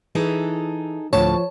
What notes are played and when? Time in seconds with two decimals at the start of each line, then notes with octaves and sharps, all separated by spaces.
0.15 E3 D#4 G#4 A4
1.13 D2 A2 D3 F3 C#5 A5